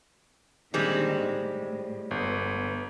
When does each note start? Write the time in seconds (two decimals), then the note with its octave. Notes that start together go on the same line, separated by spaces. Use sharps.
0.74 A#2 D3 D#3 G3 G#3 C4
1.17 A2
2.11 G1 B3